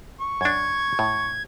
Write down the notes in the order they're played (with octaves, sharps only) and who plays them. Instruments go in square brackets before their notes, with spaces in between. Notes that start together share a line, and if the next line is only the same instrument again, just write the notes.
[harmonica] C#6
[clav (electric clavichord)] F#2 D4 [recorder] G#6
[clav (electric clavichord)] A2